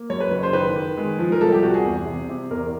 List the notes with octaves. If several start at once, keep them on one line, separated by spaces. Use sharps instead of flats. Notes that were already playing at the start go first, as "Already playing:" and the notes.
Already playing: A#3
F#2 C#5
B4
F#1
C5
D#3 B4
D#3
G#3
F3
A#4
C2 A4
G4
C3 F#4
G#4
E2
C3
C3
E2 A#4